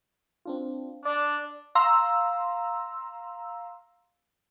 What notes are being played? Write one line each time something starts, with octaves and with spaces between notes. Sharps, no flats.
C4 D4 F4
D4 D5
F5 A#5 C6 E6